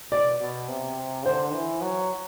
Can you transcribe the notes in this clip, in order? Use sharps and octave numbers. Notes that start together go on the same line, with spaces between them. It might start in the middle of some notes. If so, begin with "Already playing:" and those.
B2 D5
B2
C3
D3 C5
E3
F#3